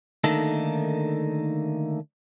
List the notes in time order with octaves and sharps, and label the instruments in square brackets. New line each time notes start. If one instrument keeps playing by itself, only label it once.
[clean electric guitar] D3 D#3 A3 A#3 D#4 A4